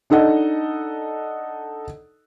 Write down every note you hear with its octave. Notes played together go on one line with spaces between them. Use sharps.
D4 D#4 A4 D#5 F#5